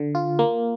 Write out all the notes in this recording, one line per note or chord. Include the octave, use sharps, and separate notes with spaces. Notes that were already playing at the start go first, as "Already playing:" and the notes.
Already playing: D3
F4
A#3